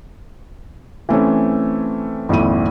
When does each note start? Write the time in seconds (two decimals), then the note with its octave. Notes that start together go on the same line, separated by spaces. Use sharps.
1.09 E3 A3 C4 C#4
2.29 G#1 F2 A#2 E4 D#7